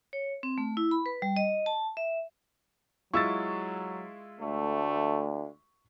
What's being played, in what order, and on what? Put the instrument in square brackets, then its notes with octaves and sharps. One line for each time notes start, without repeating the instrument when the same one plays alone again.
[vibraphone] C#5
C4
A3
E4
B5
B4
G3
D#5
A5
E5
[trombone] F#3 [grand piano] G#3 E4 F4 [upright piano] C#6 E6 A6
[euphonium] D2 [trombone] A3